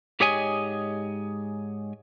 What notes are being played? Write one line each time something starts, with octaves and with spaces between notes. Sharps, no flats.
G#2 G4 G#4 C#5 D#5 G#5